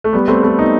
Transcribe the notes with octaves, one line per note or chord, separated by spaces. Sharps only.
A3
G3 B3
A3 C4
A3 C4
B3 D#4